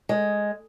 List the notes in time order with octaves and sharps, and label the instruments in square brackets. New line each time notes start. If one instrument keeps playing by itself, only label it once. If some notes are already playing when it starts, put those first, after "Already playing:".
[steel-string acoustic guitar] G#3